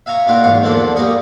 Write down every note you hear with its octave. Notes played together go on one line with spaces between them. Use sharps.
E5 F5 G#5 A#5 C#6
A#2 D#4 F4 F#4 A#4
E2 G#2 F5 C#6
E2 A#2 D3 F3 A#3 A4
G3 A#3 A#4 C#6 D#6